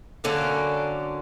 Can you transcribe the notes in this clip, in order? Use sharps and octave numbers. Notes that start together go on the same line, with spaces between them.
D3 F#3 A#3 C#4